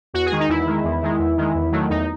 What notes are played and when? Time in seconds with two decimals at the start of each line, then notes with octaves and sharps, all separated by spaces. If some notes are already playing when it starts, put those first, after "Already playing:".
0.14 E2 F#4
0.26 G#4
0.31 D#3 G#3
0.40 D#4
0.48 E2 E4
0.66 D#3 G#3
0.84 E2
1.02 D#3 G#3
1.19 E2
1.37 D#3 G#3
1.55 E2
1.72 D#3 F#3 A3
1.90 E2 D#4